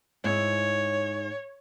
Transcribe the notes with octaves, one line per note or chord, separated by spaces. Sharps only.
G#2 E4 C#5